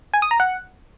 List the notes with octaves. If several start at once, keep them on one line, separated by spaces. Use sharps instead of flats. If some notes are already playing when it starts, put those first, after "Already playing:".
G#5
D#6
A#5
F#5